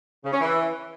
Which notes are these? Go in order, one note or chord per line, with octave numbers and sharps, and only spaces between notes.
C#3
C#4
E3